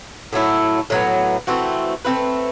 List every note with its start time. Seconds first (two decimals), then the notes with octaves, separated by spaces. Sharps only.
0.33 A2 F#3 A3 E4
0.90 A2 F#3 B3
1.47 E3 A3 C4 F#4
2.05 A3 C4 E4 B4